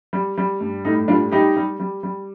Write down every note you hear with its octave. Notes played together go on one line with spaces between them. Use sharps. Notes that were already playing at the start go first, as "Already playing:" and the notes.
G3
G3
G2
A2 D#4
G3 D4 F4
G3 D#4 G4
G3
G3
G3